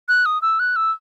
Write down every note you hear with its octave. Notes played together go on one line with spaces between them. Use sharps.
F#6
D#6
E6
F#6
E6